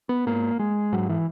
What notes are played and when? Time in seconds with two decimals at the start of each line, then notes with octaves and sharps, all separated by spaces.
0.09 B3
0.26 G#2 A#3
0.59 G#3
0.92 G#2 F#3
1.09 E3